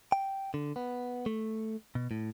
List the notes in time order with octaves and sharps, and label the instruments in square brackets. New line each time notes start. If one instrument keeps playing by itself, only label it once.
[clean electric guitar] G5
D3
B3
A3
B2
A2